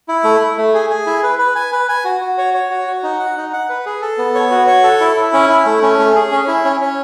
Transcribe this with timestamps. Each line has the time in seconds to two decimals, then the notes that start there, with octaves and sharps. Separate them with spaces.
0.09 E4
0.24 A3
0.40 A3
0.57 A3
0.74 G#4
0.90 G#4
1.07 E4
1.23 B4
1.39 B4
1.56 G#5
1.72 B4
1.89 G#5
2.04 F#4
2.21 F#4
2.38 C#5
2.54 C#5
2.70 F#4
2.87 F#4
3.03 D#4
3.19 F#5
3.37 D#4
3.53 F#5
3.69 B4
3.86 G#4
4.02 A4
4.18 B3
4.35 C#5
4.51 F#4
4.67 C#5
4.84 A4
5.00 E4
5.16 E4
5.33 C#4
5.49 E4
5.66 A3
5.82 C#4
5.99 A3
6.16 G#4
6.31 C#4
6.47 E4
6.65 C#4
6.81 C#4